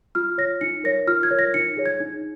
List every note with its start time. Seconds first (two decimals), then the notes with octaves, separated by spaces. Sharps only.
0.15 F4 F6
0.38 C#5 A#6
0.61 D#4 C#7
0.84 A#4 C#5 A#6
1.07 F4 F6
1.23 G#6
1.31 A#4 C#5
1.39 A#6
1.54 D#4 C#7
1.77 G#4 C#5
1.86 G#6
2.00 D#4